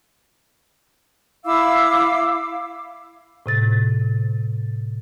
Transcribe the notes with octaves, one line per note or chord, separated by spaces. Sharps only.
E4 F5 D6 E6
A2 C3 A6